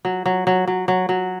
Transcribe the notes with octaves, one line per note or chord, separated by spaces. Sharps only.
F#3
F#3
F#3
F#3
F#3
F#3